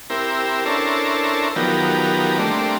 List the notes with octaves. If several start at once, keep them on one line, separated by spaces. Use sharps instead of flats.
C4 E4 G4 A#4
C#4 D4 E4 A4 A#4 C5
D#3 F3 F#3 B3 G4 A#4
G3 A3 A#3 C4 D4